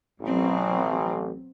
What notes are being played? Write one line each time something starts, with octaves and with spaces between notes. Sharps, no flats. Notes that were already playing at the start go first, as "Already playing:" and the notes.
A1 B2 F#3 C4